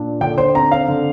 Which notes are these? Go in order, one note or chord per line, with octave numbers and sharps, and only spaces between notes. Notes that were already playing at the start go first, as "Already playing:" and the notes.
Already playing: A#2 D4
D3 G5
C5
C4 A#5
F5
D3